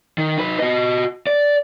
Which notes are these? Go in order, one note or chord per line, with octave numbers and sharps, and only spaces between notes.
D#3
D#4 B4
F#4 D#5
D5